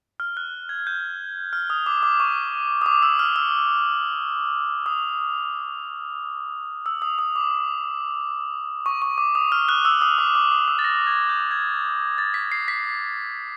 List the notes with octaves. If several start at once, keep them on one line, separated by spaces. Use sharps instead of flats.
F6
F#6
G#6
G6
F6
D#6
D6
D6
C#6
D#6
D6
E6
F6
E6
D#6
E6
D#6
D#6
D6
C#6
C#6
D6
D#6
F6
F#6
E6
D#6
D6
D6
D#6
E6
A6
A#6
G#6
G6
G#6
A6
B6
C7
B6